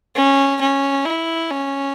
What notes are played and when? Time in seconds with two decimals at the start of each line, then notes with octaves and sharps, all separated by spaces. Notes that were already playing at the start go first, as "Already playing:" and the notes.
0.15 C#4
0.61 C#4
1.06 E4
1.51 C#4